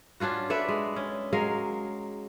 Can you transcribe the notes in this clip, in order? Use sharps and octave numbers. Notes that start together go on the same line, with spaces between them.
C#4 D4 F4 F#4
A4 B4 D5 E5
G#3
C#4
F#3 G#3 A#4 F5